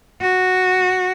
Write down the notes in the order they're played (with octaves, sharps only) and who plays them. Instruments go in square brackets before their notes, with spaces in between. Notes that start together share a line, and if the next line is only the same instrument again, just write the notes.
[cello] F#4